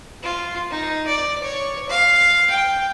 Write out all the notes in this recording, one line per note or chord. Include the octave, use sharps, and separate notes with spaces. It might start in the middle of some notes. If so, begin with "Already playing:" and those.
F4
D#4
D5
C#5
F5
G5